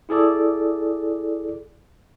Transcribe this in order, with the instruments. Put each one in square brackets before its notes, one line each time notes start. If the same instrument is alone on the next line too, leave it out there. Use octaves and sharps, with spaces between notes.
[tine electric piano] E4 G#4 A4 D5